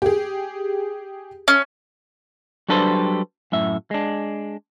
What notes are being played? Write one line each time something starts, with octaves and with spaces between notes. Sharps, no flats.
G4 G#4
C#4
F#3 G3 D4 A4 B4 C5
F#2 A2 E5
G#3 D4